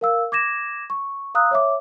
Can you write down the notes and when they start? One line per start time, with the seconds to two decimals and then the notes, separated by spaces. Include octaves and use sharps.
0.01 A#4 F5 E6
0.32 D6 G#6 A#6 E7
0.90 C#6
1.35 F5 A#5 D#6 E6 F#6
1.51 C#5 E5 D6